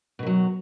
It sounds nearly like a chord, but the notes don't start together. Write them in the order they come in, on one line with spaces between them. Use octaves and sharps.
B2 D#3 F#3